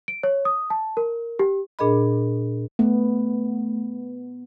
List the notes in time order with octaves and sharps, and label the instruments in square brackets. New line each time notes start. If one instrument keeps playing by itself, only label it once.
[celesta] D7
C#5
D#6
A5
A#4
G4
[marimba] A#2 D4 G#4 A#4 D#5 B5
[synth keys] A3 [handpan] B3